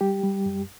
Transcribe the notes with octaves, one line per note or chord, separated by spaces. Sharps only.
G3 G4
G3
F#2